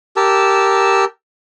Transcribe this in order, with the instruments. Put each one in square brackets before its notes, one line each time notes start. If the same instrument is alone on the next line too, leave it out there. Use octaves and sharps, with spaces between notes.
[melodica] G4 A#4 A5 E6